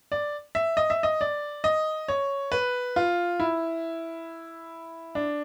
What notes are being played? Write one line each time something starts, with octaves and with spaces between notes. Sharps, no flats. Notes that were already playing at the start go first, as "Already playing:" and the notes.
D5
E5
D#5
E5
D#5
D5
D#5
C#5
B4
F4
E4
D4